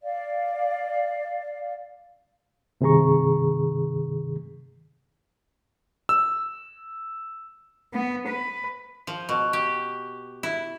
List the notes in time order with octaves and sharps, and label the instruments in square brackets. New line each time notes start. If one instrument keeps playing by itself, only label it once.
[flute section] D5 F5
[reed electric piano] G2 C3 D#3 G#4 A#5 C#6
[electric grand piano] E6
[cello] B3
B4
[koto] F3
B2
G4
E4